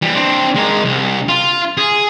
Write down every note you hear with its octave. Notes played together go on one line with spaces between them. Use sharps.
E3 G3
C4 D4
G#3 A#4
C2
F4
G#4